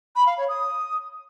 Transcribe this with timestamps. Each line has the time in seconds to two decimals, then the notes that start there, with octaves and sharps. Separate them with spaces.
0.16 B5
0.27 F5
0.37 C#5
0.48 D#6